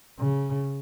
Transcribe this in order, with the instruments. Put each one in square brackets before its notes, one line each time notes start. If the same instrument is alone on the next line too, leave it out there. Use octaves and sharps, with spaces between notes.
[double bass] C#3